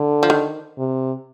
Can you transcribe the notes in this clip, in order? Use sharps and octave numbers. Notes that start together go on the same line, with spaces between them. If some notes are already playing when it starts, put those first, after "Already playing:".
Already playing: D3
F3
D#3
C3